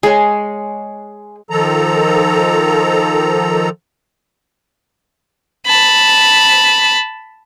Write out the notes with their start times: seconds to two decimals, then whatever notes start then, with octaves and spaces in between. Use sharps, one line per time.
0.03 G#3 G#4 C#5 G#5
1.50 D#3 F3 A4 A#5
5.67 A5 B5